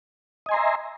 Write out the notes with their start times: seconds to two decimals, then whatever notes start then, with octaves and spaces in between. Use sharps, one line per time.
0.46 D#5
0.49 G#5
0.51 C6
0.54 A#5
0.57 E5